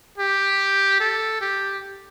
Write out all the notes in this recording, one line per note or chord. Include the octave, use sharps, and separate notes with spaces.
G4
A4
G4